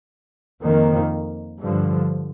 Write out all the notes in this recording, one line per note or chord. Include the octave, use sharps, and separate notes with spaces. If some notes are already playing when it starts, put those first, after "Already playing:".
F2 D#3 A#3
G2 D3 F3